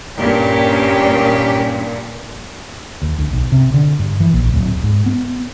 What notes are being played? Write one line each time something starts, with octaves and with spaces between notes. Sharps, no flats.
G2 A#2 D#3 C#4 G4
D#2
D2
B1
C3
D3
G2
E3
A#1
D1
G#2
B3